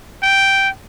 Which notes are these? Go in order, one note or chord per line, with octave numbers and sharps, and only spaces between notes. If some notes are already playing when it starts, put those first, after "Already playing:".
G5